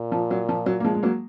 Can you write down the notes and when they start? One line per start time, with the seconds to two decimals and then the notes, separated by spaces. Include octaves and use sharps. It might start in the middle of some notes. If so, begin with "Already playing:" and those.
Already playing: A#2
0.12 F3
0.31 F#3
0.49 F3
0.66 F#3
0.80 A#3
0.85 F3 G#3
0.95 G#3
1.03 F#3 A#3